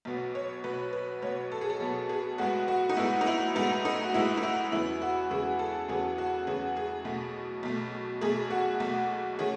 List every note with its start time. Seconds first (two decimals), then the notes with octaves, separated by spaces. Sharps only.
0.05 B1 B2 F#3 B3
0.35 C#5
0.64 B1 B2 F#3 B3 B4
0.93 B4
1.22 B1 B2 F#3 B3 C#5
1.52 A4
1.61 G#4
1.70 A4
1.80 B1 B2 F#3 B3
2.09 G#4
2.38 B1 A2 G#3 B3 F#4
2.68 F#4
2.89 D#4
2.97 B1 A2 G#3 B3 E4
3.21 D#4
3.27 E4
3.55 B1 A2 G#3 B3 D#4
3.85 D#4
4.04 F#4
4.14 B1 A2 G#3 B3 E4
4.38 D#4
4.43 E4
4.71 E2 C#3 F#3 B3 E4
5.02 F#4
5.30 E2 C#3 F#3 B3 G#4
5.59 A4
5.88 E2 C#3 F#3 B3 G#4
6.18 F#4
6.47 E2 C#3 F#3 B3 G#4
6.76 G#4
7.05 B1 B2 A3
7.63 B1 B2 A3
8.21 B1 B2 A3 G#4
8.51 F#4
8.80 B1 B2 A3
9.39 D#3 A3 C#4 G#4